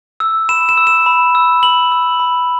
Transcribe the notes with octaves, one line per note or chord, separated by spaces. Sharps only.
E6
B5 E7
E7
E6
E7
B5
E6
B5 F#7
E6
B5